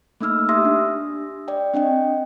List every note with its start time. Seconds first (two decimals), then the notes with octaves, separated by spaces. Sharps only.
0.21 A3 A#3 D#4 E6 F6
0.49 G4 E5 C6 D#6 E6 A#6
0.65 D4
1.48 D5 G5
1.74 C4 D4 D#5 G5